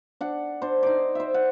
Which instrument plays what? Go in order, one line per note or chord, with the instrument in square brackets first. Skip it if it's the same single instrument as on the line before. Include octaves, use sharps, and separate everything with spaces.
[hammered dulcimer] D4 F#5
D4 C5
D#4 D5
C5 E5
F#5